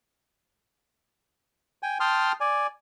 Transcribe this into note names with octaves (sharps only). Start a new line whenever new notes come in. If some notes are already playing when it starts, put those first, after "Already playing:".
G5 G#5
G5 A5 C6 D#6 F6
D5 G#5